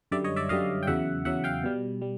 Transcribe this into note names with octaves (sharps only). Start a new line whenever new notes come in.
F#2 D3 G3 D5 E5
C#5 D#5
D5 E5
F#2 D3 G3 D#5 F5
G5
E2 C#3 F#3 E5 F#5
E2 C#3 F#3 E5 F#5
F5 G5
B2 G3
G3